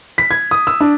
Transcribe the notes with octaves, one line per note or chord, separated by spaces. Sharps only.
B6
G#6
D#6
E6
D4